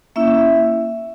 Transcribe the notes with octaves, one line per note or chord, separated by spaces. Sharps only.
A#3 C#4 E4 E5